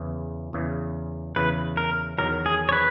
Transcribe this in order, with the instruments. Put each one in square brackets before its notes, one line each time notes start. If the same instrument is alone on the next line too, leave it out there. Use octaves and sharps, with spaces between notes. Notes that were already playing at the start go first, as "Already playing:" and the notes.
Already playing: [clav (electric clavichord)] E2 C#3 E3
E2 C#3 E3
[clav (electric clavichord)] E2 C#3 E3 [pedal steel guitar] B4
[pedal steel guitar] A#4
[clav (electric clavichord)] E2 D#3 F#3 [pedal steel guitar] A#4
[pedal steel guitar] G#4
C#5
B4